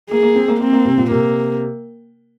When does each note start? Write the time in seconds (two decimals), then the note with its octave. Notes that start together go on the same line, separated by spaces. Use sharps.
0.10 A#3 G#4
0.23 A#3
0.35 C4
0.48 A#3
0.61 A#3 C4
0.73 A#3
0.85 C3
0.97 A#2
1.11 C3 A#3